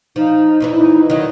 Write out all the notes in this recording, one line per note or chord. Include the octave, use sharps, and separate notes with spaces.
F3 D#4
E2 E3 E4
D#4
D#3 F#3 D#5